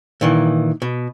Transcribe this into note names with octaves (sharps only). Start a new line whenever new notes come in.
A#2 D#3 E3
B2